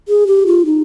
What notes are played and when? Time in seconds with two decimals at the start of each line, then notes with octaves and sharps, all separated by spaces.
0.08 G#4
0.27 G4
0.47 F4
0.65 D#4